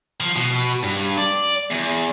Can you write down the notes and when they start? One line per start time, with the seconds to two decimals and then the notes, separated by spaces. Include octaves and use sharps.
0.20 F3
0.36 B2
0.83 G2
1.18 D5
1.71 E2